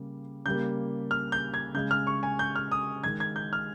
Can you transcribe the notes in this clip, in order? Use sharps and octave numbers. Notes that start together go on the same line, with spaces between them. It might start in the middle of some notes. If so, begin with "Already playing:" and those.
Already playing: C#3 G3 A#3
C#3 G3 A#3 G6
F6
G6
G#6
C#3 G#3 G6
F6
C#6
G#5
G6
F6
D#6
D#3 G#3 G#6
G#6
G6
F6